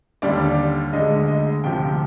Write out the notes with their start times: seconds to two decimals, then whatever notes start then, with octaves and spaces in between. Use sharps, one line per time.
0.22 D#2 D3 G3 D5
0.93 D2 D3 G#3 D#5
1.28 D#5
1.64 D2 C3 F3 G5